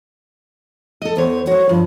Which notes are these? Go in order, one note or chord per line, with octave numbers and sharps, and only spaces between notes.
A4 D#5
E2 C5 C#5
F#4 C5 C#5
G2 F3